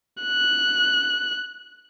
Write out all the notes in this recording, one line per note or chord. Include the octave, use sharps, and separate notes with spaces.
F#6